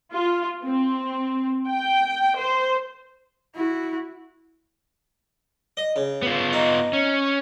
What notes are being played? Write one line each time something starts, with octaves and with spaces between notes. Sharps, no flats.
F4
C4
G5
C5
E4 F#4
D#5
C#3
B3 F4
D#4
C#4